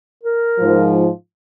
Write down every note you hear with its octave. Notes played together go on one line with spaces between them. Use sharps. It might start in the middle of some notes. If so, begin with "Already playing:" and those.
A#4
G#2 F3